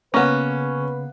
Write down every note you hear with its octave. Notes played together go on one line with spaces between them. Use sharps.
C#3 A#3 B3 C#4 B4